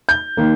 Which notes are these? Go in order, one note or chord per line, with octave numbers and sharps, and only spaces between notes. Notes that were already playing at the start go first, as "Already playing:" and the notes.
G6
D#3 A#3